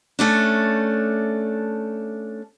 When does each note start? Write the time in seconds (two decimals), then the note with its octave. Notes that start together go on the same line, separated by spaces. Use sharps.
0.19 A3 C#4 D4